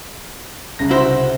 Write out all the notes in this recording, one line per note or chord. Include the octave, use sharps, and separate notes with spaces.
C2 C#3 A#6
E4 F#4 C5